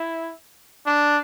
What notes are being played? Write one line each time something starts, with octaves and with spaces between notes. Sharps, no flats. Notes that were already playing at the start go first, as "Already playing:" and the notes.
Already playing: E4
D4